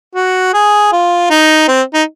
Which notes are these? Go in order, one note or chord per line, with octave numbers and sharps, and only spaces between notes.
F#4
G#4
F4
D#4
C4
D#4